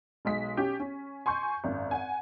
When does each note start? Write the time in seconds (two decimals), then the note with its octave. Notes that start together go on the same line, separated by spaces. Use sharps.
0.25 B1 G#3 B6
0.57 C#4 G4
0.80 C#4
1.26 G#5 C6 C#6 G6
1.64 G#1 F#2
1.91 F#5 G#5